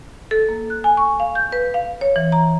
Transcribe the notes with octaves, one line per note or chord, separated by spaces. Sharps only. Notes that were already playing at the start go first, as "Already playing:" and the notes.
A4
A#3
F#6
G#5
C#6
F5
G6
B4
F5
C#5
E3
A#5